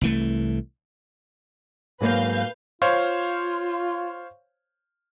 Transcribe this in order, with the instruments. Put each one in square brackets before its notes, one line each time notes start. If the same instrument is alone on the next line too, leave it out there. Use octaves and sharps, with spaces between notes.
[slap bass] C2 E3 A3
[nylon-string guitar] G#2 F#3 A#3 [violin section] B4 F5 G6
[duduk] F4 [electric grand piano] C5 C#5 F5